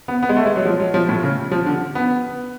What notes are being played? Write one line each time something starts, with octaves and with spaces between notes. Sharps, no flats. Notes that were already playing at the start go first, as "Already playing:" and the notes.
B3
B3
G#3
A3
G#3
F#3
F3
F#3
F3
A2
C#3
F3
D3
B3